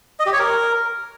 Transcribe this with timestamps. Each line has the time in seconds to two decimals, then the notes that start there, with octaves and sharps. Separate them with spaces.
0.19 D#5
0.26 G4
0.33 C#5
0.39 A#4